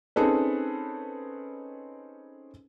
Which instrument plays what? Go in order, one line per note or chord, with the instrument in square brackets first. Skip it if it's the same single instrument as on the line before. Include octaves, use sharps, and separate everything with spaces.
[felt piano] C4 C#4 D#4 G#4 A4 B4